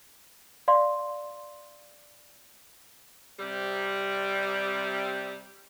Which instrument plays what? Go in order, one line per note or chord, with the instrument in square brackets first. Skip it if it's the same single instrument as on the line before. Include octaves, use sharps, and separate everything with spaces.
[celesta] D5 F5 C6
[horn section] C3 G3